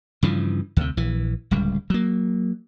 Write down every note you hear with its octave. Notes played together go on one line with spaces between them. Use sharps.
G2 C#3 E3 F3
D2 C3
A#1 E3
D1 C#2 G3
F#3 A#3